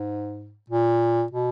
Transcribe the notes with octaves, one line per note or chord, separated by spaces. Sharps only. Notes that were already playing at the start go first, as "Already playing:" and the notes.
Already playing: G#2
A#2
B2